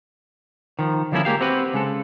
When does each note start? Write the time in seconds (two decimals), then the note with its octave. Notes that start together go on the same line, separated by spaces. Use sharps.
0.79 D#3 F3
1.12 D3 F3 G3 A#3 C#4 E4
1.25 G#3 A#3 G4 F5
1.41 C4 F#4 G4 B4
1.74 C#3 G#3 A4